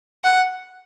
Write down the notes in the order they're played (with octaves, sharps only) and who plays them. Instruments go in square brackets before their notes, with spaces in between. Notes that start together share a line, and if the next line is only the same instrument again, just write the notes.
[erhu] F#5